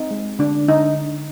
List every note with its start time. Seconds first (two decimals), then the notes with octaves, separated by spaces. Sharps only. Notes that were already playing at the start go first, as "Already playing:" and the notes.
Already playing: C4 D#4
0.11 G#3
0.39 D3 D4
0.68 D3 D#4